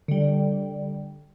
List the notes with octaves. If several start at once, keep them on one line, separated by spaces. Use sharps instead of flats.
D3 G3